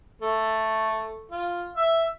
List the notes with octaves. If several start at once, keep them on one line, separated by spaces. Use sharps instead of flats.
A3
F4
E5